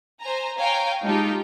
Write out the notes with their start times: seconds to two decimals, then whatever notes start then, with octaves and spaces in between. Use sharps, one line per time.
0.21 C5 G#5 A#5
0.57 C#5 F5 G5 G#5 A#5
1.03 G#3 D#4 F4 G4 A4 G5